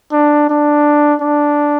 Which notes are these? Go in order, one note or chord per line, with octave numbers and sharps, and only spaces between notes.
D4
D4
D4